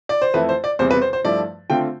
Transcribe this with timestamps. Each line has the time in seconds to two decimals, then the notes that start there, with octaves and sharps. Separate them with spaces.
0.09 D5
0.22 C5
0.34 F2 E3 A3 E4 B4
0.49 C5
0.64 D5
0.79 E2 C3 G3 C4 C5
0.91 B4
1.02 C5
1.13 C5
1.24 G2 F3 A3 E4 D5
1.70 D3 A3 C4 F4 G5